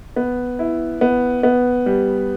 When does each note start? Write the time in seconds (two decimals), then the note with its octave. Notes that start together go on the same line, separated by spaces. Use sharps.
0.16 B3
0.59 E4
1.01 B3
1.43 B3
1.86 G3